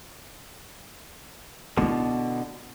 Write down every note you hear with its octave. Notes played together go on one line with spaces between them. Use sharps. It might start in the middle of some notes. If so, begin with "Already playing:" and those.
B2 D3 B3 E4